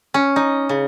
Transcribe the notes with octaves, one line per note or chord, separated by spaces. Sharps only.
C#4
D#4
C#3